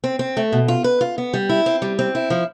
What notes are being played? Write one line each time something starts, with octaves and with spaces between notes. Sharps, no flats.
C4
C4
A3
B2
F4
B4
F4
B3
G3
E4
C4
G3
C4
E4
F3